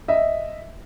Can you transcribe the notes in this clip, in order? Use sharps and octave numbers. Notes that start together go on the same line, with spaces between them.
D#5 E5